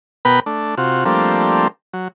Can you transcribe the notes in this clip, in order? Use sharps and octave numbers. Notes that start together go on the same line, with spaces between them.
B2 B3 A#4 B4 G5 B5
A3 D4
C3 F4 F#4
F3 G3 A3 A#3 C4 D4
F#3